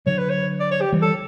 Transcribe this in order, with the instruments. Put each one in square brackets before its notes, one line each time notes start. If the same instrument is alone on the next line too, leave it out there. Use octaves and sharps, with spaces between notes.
[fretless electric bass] D3 F#3 [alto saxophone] C#5
[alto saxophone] B4
C#5
D5
C#5
G4
[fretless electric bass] E3 G3
[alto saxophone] A4